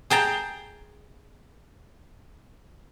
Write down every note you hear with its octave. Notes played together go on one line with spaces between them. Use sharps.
G#4 G5 A5 A#5